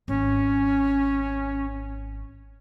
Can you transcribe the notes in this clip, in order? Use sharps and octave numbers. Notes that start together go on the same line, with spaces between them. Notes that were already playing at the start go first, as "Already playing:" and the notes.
G#1 C#4